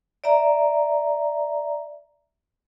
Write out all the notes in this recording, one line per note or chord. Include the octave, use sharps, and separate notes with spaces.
D5 E5 A#5